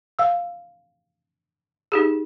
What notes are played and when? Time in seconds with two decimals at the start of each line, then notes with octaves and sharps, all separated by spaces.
0.19 F5 E6
1.92 D#4 G4 G#4